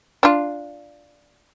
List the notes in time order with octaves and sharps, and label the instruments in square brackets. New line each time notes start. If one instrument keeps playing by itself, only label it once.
[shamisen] D4 F4